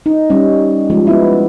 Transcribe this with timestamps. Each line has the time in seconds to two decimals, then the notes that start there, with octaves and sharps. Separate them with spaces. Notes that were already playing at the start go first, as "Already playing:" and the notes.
0.06 D#4
0.30 G3 C#4
0.90 F3 G#3
1.07 B3 E4